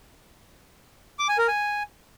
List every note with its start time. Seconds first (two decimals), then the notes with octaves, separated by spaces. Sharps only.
1.19 D6
1.29 G#5
1.38 A#4
1.48 G#5